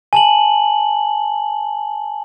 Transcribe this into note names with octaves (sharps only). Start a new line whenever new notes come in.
G#5 A5 F#7